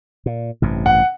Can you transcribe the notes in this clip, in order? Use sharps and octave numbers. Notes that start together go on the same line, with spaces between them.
A#2
A1 G2 C3
F#5